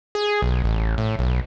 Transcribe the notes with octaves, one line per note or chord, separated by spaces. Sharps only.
G#4
B1
A1
A2
B1